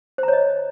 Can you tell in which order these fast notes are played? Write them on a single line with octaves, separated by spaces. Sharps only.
C5 A#5 C#5 D#5